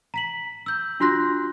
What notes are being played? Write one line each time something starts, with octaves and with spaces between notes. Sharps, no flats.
A#5 B6 F#7
E6 G6
D4 F4 F#4 C6 F#6 A#6